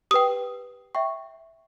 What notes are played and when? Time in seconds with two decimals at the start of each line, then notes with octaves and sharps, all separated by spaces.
0.11 G4 B4 G5 D#6
0.95 E5 G5 C#6